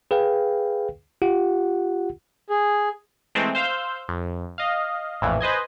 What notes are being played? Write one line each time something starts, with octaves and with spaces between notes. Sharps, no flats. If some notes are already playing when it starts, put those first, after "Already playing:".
G#4 B4 F5 G5
F4 G4 F#5
G#4
E3 G#3 A3 C4
C5 F5 E6 G6
F2
D#5 F5
A#1 F2 A2 E3
B4 C5 D#5 G#5